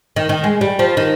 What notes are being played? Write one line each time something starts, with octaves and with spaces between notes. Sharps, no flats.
D#3
D#3
G#3
G3
F3
D#3